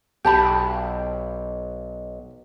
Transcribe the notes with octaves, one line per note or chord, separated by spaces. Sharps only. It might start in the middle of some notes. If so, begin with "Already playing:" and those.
B1 G4 A5 B5